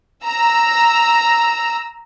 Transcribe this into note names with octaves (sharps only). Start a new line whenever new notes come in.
A#5 E6